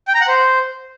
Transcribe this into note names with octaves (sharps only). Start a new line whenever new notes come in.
G5
A#5
F#5
C5